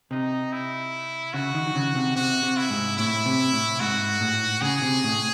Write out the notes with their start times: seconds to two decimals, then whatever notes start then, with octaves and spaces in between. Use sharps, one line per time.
0.11 C3 D#4
0.52 E4
1.33 C#3 F#4
1.55 D#3
1.67 D#3
1.76 C#3
1.95 C3
2.16 C3 F#4
2.43 C3
2.57 E4
2.70 G#2
2.97 A2 E4
3.26 C3
3.53 A2
3.80 G#2 F#4
4.21 A2
4.62 C#3 G#4
4.82 C3
5.04 A2